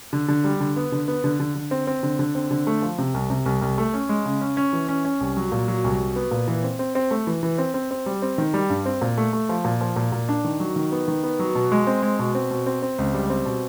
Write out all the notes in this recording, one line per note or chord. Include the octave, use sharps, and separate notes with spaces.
D3
D3
G3
D3
B3
D3
B3
D3
D3
D3
C4
C4
D3
D3
C4
D3
A3
F3
C3
C2
C3
C2
C2
A3
C#4
G#3
C#3
C#4
C#4
E3
C#4
C#4
C2
F#3
A#2
F#3
C2
F#3
B3
A#2
E3
C4
C4
C4
A3
E3
E3
C4
C4
C4
G3
C4
D#3
G3
G2
C4
A#2
A3
A3
F3
A#2
F3
A#2
A#2
D4
D#3
F#3
D#3
B3
D#3
B3
F#3
B2
G#3
C4
G#3
B2
C4
B2
C4
C4
C#2
G3
C4
B2